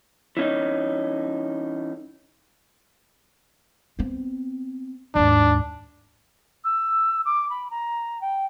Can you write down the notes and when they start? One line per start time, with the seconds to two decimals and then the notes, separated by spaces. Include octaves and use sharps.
0.37 E3 C#4 D#4
3.99 B3 C4
5.15 D#2 G#2 D4
6.64 E6
7.25 D6
7.50 B5
7.71 A#5
8.21 G5